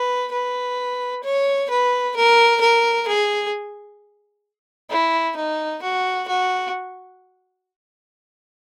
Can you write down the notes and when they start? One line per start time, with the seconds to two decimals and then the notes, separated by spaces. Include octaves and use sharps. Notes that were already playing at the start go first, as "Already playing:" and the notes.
Already playing: B4
0.32 B4
1.24 C#5
1.70 B4
2.16 A#4
2.61 A#4
3.07 G#4
4.90 E4
5.36 D#4
5.82 F#4
6.28 F#4